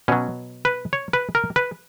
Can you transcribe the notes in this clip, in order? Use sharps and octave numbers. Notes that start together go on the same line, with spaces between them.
B2 F#3 C#4
B4
C#5
B4
A#4
B4